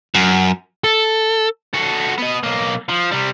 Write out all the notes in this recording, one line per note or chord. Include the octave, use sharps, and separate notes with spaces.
F#2
A4
F#4 A4
B3 D#5
B1 A#3
F3
C3 G3